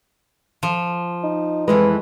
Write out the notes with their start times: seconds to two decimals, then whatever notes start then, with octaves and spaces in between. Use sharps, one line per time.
0.63 F3
1.24 D#4
1.68 F2 E3 G#3 B4